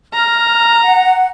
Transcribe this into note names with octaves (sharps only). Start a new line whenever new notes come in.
A#5 F6
F#5